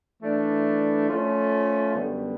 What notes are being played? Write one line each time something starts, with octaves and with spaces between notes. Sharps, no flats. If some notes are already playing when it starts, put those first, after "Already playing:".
E3 A3 D4
F3 A3 C#4 F4
F#2 D3 G3 B3